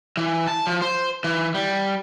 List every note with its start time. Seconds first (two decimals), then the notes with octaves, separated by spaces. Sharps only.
0.17 E3
0.48 A5
0.67 F3
0.82 C5
1.24 E3
1.55 G3